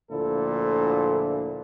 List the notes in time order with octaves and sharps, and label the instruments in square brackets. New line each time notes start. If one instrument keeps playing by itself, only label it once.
[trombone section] D2 A#2 D3 F3 E4 A4